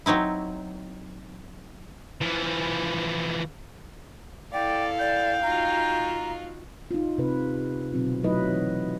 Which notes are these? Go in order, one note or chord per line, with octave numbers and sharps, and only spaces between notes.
F#3 C4 D#4 E4
E3 F3
E4 A4 D5 F5 G5
D5 G5
D#4 F4 F#4 A#5
D#4 F4
C3 B4
B2 D3 F#3 C4 F4
F#3 A3 D#4 E4 B4 D#5
E3